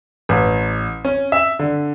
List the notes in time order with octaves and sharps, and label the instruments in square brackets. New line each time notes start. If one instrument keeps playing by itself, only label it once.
[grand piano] A1
C#4
E5
D3